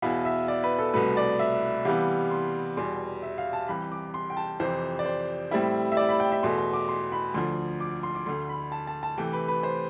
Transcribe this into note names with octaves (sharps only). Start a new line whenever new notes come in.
E2 B2 B3 E4 F5
E5
D5
B4
A4
C2 B2 A3 B4
D5
E5
C3 E3 G3 B3 F5
C6
E2 B2 G3 C6
E5
F5
A5
C2 C3 E3 B5
D6
C6
G5
A5
F2 C3 E3 C5
D5
C5
A2 G3 C4 E4
E5
D5
B5
G5
E5
E2 B2 A3 C6
C6
D6
C6
B5
D2 D3 F3 C6
D6
C6
D6
D2 D3 A3 C6
B5
A5
A5
A5
C3 E3 A3 G5
B4
B4
C5